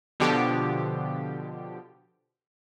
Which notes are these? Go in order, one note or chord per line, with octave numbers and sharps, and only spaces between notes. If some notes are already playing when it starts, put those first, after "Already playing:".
B2 D3 F3 G4